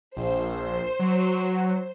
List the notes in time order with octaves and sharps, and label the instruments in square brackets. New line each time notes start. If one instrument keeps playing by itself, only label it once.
[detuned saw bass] A#1 [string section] C5
[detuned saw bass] F#3